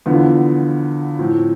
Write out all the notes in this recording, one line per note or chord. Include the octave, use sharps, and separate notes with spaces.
E2 D3 F3 B3 F4
A2 F3 C4